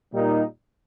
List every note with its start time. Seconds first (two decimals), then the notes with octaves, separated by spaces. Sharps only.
0.13 A#2 G3 A#3 D#4